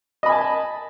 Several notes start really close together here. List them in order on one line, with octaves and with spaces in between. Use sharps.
D#5 B5 G#5 A5